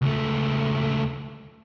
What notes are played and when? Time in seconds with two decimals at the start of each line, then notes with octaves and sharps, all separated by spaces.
0.02 C#2 A3